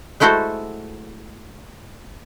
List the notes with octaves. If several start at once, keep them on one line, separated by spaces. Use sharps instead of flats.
G#3 A3 E4 F#4 A4 C5